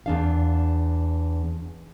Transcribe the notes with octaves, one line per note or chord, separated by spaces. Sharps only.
E2 D4 F5